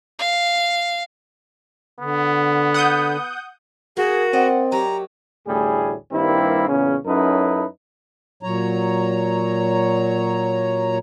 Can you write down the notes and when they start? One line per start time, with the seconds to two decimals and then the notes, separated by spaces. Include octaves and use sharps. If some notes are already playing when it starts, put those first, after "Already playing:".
0.19 F5
2.00 D3 B3
2.74 F#5 D#6 G6
3.97 A#3 F#4 G#4
4.33 C4 D5 D#5 F#5
4.72 F#3 G4 C#5 A#5
5.47 A1 D2 A2 G3 G#4
6.12 G2 D#3 G3 A#3 C4 E4
6.69 E2 A#2 C#3 C#4
7.06 F#2 C#4 D#4 E4 A4 B4
8.43 A#2 F#3 C#5 A#5